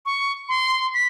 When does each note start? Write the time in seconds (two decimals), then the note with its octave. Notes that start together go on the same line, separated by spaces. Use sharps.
0.06 C#6
0.49 C6
0.94 B6